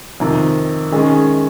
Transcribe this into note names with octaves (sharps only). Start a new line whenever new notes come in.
F2 C3 D#3
D#3 G#3 C#4 G#4